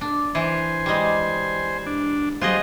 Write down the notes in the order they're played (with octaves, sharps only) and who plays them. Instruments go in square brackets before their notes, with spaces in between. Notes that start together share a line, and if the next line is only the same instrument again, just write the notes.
[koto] D4
[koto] E3 [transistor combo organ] C5 G#5
[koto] G3 G#3
[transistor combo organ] D4
[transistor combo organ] F#3 G3 C5 [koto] F4 G#4 D#5